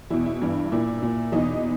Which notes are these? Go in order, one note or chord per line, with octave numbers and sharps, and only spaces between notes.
E2 B2 E4
E4
G2 E3
A#2 E4
A#2
E2 B2 D#4